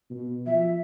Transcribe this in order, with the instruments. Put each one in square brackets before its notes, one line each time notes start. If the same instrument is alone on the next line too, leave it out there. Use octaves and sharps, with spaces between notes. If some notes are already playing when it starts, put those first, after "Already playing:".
[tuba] B2
[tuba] F3 [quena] E5